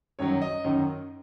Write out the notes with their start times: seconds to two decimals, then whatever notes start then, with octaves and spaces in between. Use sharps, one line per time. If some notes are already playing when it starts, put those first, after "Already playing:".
0.19 F#2 D#3 F#3 C#5
0.42 D#5
0.64 F#2 D#3 F#3